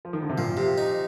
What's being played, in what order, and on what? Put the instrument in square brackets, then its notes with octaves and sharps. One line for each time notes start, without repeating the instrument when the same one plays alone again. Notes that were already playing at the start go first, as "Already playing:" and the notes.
[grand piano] F3
D#3
D3
C3
[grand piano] A#2 [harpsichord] F3
[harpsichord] C3
D#4